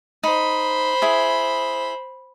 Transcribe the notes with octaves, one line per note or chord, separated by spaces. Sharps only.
D#4 C5 B5
E4 G#4